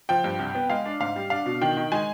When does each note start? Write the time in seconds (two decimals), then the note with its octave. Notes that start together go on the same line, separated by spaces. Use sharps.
0.09 F3 G5
0.24 G2
0.39 C2
0.55 B3
0.70 G#3 F5
0.85 D4
1.00 G#2 F5
1.16 G3
1.30 D4 F5
1.46 B2
1.61 D#3 G5
1.77 D#3
1.92 G#3 G#5